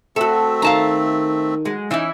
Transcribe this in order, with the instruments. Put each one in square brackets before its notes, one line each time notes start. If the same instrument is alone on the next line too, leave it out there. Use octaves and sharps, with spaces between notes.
[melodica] A3 C4 E5 [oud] F#4 A4
[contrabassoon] D#3 [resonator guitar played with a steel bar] F5 A5 A#5
[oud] F#3 G#3
[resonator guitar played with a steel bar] E3 E4 [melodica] C#4 [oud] D#4 E5